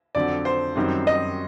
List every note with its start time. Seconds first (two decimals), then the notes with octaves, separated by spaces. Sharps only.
0.15 F2 D3 F#3 D5
0.45 C5
0.76 F#2 D#3 G3 C4
1.07 D#5